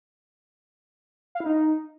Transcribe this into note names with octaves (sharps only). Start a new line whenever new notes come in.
F5
E4
D#4